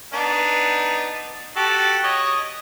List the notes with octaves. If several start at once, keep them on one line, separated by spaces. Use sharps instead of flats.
B3 D4 D#4
F#4 G4 A4
C#5 D#5